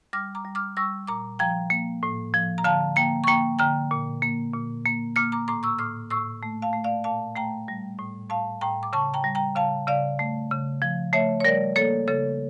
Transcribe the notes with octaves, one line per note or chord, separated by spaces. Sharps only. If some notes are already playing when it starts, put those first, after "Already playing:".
G3 D6 F6
A#5 D6
G3
D6 F6
G3 C#6 E6
A#2 A#5 D6
F3 G5 A#5
A#3
A2
F3
A#5
D3 F5 A5
A#3 G5 A#5
C#6
A#3 G5 A#5
D3 G5 A#5
A#2
A#3
A#2
A#3
A#3 D6 F6
A#5 D6
A2 A#5 D6
C#6 E6
A2 D6 F6
A2 C#6 E6
A3
F5 A5
A3
D5 F5
A#2 F5 A5
A3 G5 A#5
G3
A2
A2 F5 A5
A2 G5 A#5
D6
C#3 A5 C#6
G5 A#5
G3
G5 A#5
C#3 F5 A5
C#3 D5 F5
A3
C#3
F3
A3 C#5 E5
C#5
G3 A#4 D5
A#3 A4 C#5
C#3 A4 C#5